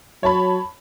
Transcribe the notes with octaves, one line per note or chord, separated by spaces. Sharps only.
F#3 C#5 A5 B5